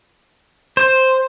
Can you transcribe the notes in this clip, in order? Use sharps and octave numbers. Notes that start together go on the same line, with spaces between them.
C5